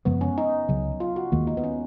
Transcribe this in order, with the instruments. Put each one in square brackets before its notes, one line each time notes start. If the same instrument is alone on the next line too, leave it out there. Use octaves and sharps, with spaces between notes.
[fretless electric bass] F#2 C#3 F3 G#3 [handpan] B3
[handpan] C#4
D#4
[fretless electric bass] C#2 C#3 F#3
[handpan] F4
F#4
[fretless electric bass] D#2 D#3 A#3 [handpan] G#3
[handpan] D#4
B3
C#4